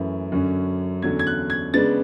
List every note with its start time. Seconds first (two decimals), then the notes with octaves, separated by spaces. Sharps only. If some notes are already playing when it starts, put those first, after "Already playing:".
Already playing: F#2 E3 A3 C#4 E4
0.32 F#2 D3 F#3 C#4
1.02 E2 D3 F#3 C#4 G#6
1.19 G#6
1.27 F#6
1.50 G#6
1.74 C#3 G#3 B3 D4 A6